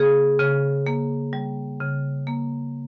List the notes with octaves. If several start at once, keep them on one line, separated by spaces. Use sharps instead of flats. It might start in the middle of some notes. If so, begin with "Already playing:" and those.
Already playing: C#3 A#3 G#4
C#3
A#3
G3
C#3
A#3